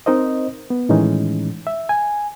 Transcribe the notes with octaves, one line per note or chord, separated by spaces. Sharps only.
C4 D#4 A#4 C5 D#5
B3
A2 D#3 E3 G#3 C#4 D#4
E5
G#5